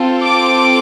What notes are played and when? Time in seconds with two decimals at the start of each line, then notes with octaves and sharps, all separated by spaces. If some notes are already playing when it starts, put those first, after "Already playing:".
Already playing: C4 F4 A4
0.22 D6